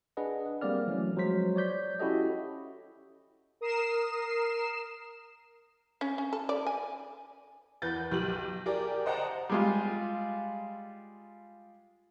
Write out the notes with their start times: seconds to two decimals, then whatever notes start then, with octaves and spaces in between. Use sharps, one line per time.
0.17 D4 G#4 B4 D#5 F#5
0.61 G3 A#3 C4 D5 F6
0.87 E3 F#3 A3 A#3 C#4
1.16 F3 F#3 G#3 C5 B6
1.56 C#5 D5 G6 B6
2.00 C#4 E4 F#4 G4 A4 D#5
3.61 A#4 D#6 C7 E7
6.01 C#4
6.18 C#4
6.33 A4
6.49 D5
6.67 G#5
7.82 E2 B4 G6 A6
8.11 B1 G4 F#7
8.66 G4 G#4 A#4 D5
9.06 C5 D#5 F#5 G5 A5 A#5
9.49 G3 G#3 F4